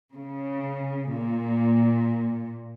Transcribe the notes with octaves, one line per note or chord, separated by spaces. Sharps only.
C#3
A#2